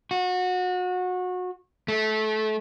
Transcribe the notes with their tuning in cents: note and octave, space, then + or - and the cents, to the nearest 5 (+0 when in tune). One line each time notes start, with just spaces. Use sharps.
F#4 -25
A3 -25